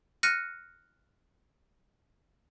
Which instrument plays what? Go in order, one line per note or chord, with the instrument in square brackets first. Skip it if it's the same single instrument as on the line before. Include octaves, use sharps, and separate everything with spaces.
[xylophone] F6 F#6 A#6 C#7 D#7